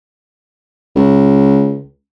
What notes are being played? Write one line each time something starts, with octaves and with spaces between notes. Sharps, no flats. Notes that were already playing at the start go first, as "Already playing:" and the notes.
C#2